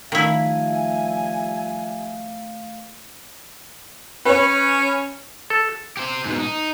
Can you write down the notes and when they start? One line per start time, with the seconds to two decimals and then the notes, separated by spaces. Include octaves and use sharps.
0.12 D#3 F3 G3 A3 E4 E5 F5 G#5
4.25 C#4 B4 C#5
5.50 A4
5.97 G4 C5
6.25 G#2 B2
6.39 D#4